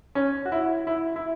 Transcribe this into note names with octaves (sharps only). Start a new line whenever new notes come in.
C#4
F#4
E4
E4
E4